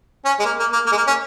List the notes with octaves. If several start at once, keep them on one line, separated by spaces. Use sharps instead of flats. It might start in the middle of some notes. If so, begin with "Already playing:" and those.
C#4
G#3
A#3
A#3
A#3
A#3
G#3
A#3
C#4